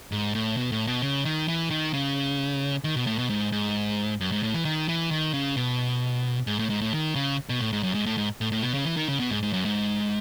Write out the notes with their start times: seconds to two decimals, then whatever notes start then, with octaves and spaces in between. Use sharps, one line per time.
0.12 G#2
0.35 A2
0.57 B2
0.72 A2
0.87 B2
1.02 C#3
1.25 D#3
1.48 E3
1.70 D#3
1.94 C#3
2.84 D#3
2.96 B2
3.07 A2
3.18 B2
3.30 G#2
3.52 G#2
4.21 F#2
4.32 G#2
4.43 A2
4.54 E3
4.65 D#3
4.89 E3
5.11 D#3
5.34 C#3
5.57 B2
6.47 G#2
6.59 A2
6.70 G#2
6.81 A2
6.93 D#3
7.15 C#3
7.49 B2
7.61 A2
7.73 G#2
7.83 F#2
7.95 G#2
8.06 A2
8.18 G#2
8.41 A2
8.52 A2
8.63 B2
8.74 C#3
8.85 E3
8.97 D#3
9.08 C#3
9.20 B2
9.31 G#2
9.43 G#2
9.53 F#2
9.65 G#2